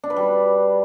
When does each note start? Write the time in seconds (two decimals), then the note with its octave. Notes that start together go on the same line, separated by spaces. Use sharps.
0.04 D4
0.10 B4
0.17 G3